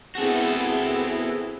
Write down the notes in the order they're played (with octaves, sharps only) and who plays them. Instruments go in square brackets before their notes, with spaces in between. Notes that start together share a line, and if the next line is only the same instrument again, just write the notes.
[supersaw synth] B3 E4 G#4 [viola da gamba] C4 [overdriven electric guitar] F#4 A4